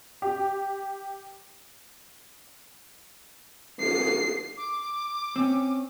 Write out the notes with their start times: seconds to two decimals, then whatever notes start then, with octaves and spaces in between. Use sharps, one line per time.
0.22 G4
3.81 C7
4.57 D6
5.36 C4 C#4